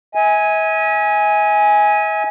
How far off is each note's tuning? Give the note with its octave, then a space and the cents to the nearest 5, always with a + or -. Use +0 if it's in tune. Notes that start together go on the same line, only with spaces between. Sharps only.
E5 -45 G#5 +0